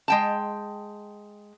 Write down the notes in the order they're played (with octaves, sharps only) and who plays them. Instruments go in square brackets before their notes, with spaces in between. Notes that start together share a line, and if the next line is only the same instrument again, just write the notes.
[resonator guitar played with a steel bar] G#3 G5 A5